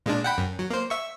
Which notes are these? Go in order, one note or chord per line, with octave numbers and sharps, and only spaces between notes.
A#2 G#3 D4
F#5 G5 B5
F#2
F#3
A#3 C5
E5 C#6